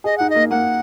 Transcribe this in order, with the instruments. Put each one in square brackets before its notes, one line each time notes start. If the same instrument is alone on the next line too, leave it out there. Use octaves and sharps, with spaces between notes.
[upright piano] G#4 [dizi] D#5
[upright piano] D#4 [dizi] F#5
[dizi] D#5
[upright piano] A#3
[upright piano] A#3 [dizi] F#5